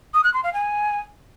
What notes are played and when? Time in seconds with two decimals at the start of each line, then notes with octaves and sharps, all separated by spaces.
0.14 D#6
0.24 F#6
0.34 C6
0.44 F5
0.54 G#5